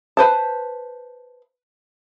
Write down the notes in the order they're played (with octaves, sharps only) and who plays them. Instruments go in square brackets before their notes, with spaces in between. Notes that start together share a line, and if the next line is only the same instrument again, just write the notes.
[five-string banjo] B4 C5 A5